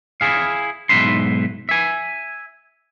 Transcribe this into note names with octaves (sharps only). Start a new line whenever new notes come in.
E4 G#4 F5
B1 E2 G#2 B4 E5 C6
E5 G#5